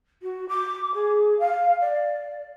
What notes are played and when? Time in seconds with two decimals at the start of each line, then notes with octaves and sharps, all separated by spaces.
0.22 F#4
0.48 D6
0.94 G#4
1.39 F5
1.81 D5